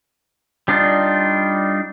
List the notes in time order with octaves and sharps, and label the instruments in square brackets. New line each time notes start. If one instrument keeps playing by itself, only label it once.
[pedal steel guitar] G3 D4 D#4 F4